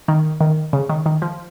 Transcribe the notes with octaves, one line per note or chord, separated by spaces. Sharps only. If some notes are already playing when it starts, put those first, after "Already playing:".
D#3
D#3
C#3
D#3
D#3
F3